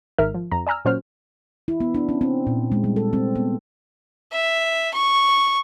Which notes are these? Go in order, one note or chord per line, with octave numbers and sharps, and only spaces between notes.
G#1 G#2 D#3 A#4 E5 F6
F3
F2 A#5
D5 G#5 A#5 E6 F6
A#2 F#3 C#4 C5 C#5 F6
E4
B3
D4
C#4
C4
A#2
G#3
G3
A4
C4
B3
E5
C#6